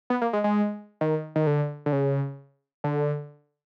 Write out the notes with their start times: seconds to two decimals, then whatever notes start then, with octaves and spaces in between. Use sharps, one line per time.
0.10 B3
0.22 A#3
0.33 G#3
0.44 G#3
1.01 D#3
1.36 D#3
1.47 D3
1.86 D3
1.93 C#3
2.84 D3